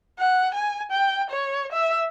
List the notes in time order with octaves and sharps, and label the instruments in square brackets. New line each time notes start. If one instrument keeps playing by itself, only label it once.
[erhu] F#5
G#5
G5
C#5
E5